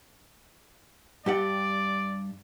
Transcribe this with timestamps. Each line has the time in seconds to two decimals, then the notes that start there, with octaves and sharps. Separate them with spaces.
1.26 G2 G4 D5 F#5